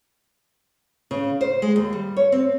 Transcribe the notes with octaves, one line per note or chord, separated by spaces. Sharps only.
C#3
C5
G#3
D#2
G3
C#5
C4